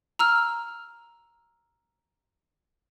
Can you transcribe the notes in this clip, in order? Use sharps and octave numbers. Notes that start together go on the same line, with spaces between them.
A#5 E6 F6